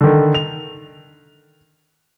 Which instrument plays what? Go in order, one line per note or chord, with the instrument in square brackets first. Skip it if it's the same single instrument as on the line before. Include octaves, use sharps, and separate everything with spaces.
[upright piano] D3 D#3
F7